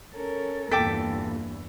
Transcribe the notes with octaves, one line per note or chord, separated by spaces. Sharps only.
C#4 A4 A#4
E2 G2 A#2 A4 G5 D6 E6 B6